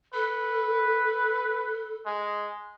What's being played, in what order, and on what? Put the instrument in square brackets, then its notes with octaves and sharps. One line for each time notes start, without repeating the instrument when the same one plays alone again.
[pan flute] A4 [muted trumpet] B4
[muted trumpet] G#3